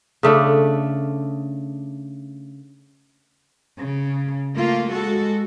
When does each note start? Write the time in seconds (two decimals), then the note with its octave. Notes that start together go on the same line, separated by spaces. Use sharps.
0.23 C#3 A3 D4
3.77 C#3
4.54 A3 A#3 F4
4.91 G#3 F#4 A4